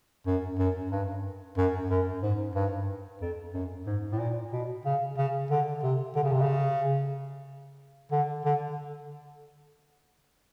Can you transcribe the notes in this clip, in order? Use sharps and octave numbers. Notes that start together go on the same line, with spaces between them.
F#2
F#2
G2
F#2
F#2
G#2
G2
F2
F#2
G#2
A2
A#2
B2
C#3
C#3
D3
C3
D3
C#3
C3
C#3
D3
D3